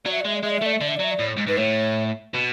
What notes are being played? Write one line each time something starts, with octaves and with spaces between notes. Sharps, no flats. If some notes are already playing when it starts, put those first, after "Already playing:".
F#3 D5
E5
D5
G#3 E5
D5
G#3 E5
D5
E5
A3 D5
E5
D3 D5
E5
D5
F#3 E5
D5
A2
G#2
G#2 B4
A2 C#5
B2